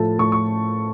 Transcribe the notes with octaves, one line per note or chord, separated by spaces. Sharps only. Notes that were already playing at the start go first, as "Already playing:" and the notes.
Already playing: A2 F3 A3 A5
A2 C#6
C#6